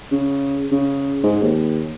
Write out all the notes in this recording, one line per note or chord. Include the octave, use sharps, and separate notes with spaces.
C#3
C#3
G#2
D#2